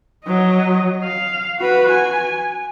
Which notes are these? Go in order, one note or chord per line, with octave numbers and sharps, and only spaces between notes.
F#3 D#5
F5
F#4 B4
G#5